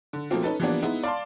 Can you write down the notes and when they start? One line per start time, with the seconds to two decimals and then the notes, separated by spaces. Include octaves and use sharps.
0.13 D3
0.30 B2 F3 A3 A#3 C4 F4
0.43 C#4 D#4 A4 B4
0.60 E3 F3 G3 A#3 B3 D4
0.82 G#3 B3 D#4 E4
1.04 D5 F5 A5 C6